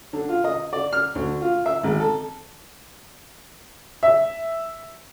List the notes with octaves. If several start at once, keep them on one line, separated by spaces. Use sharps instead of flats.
D3
F4
D#5
D5
F6
D2
F4
E5
G#1
A4
E5